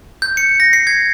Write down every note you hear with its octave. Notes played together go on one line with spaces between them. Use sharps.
G6
C#7
A#6
C7
G#6